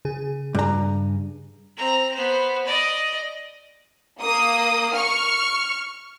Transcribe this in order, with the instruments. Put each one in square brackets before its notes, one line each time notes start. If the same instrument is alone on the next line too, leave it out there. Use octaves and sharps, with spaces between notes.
[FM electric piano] C#3 G#4
[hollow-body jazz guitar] G2 A#5
[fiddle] C4 A#5
B3 C5
D5 D#5
[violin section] A#3 D#6
C#6 F6